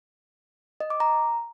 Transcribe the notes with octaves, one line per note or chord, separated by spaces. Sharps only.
D#5
D6
A#5